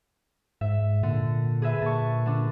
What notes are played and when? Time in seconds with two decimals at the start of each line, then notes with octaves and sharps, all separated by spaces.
0.61 G#2 E5
1.03 A#2 D3
1.62 G#4 B4 E5
1.82 A#2 A5 C#6
2.26 D3 D4